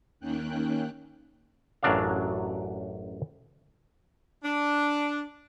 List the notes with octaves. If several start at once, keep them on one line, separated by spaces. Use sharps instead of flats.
D#2 D#3 A#3 C#4 G5 F#6
A1 F#2 F#3 D4 D5 F5
D4